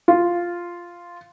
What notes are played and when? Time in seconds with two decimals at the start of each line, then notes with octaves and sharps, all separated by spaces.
0.08 F4